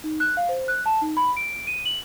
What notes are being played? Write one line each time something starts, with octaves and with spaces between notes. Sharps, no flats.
D#4
F#6
F5
C5
F#6
A5
D#4
B5
D7
D#7
F#7